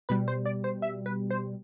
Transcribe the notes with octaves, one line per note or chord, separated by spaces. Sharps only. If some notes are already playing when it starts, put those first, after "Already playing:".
B2 G3 B4
C5
D5
C5
E5
B4
C5